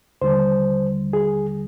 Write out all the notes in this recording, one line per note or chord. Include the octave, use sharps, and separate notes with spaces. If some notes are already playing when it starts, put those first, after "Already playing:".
D#2 D3 G3 C5
G#4